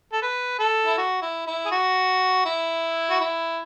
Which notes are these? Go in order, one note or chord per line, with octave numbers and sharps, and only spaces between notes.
A4
B4
A4
E4
F#4
E4
E4
G#4
F#4
E4
F#4
E4